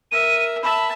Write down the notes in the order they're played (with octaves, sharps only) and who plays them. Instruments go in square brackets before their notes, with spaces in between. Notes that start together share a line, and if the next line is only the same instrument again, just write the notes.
[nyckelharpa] A#4 E5 [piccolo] D#7
[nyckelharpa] E5 A5 [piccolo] B5